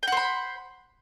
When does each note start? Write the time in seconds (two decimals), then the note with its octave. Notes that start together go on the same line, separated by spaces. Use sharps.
0.03 G5
0.07 F#5
0.12 C5
0.17 B5